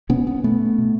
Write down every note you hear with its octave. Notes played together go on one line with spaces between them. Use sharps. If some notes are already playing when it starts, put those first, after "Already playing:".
B2 B3 C#4
B3 C#4
B2 A3 B3
B2